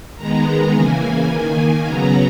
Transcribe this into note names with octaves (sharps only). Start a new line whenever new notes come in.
D#3 G#3 B3 A#5
C#3 E3 A#3 G#5
D#3 A#3 G#5
C#3 F#3 B3 A#5